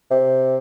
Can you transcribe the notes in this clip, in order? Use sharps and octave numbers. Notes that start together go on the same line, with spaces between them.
C3